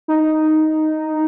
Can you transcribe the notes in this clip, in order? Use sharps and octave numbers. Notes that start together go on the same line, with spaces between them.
D#4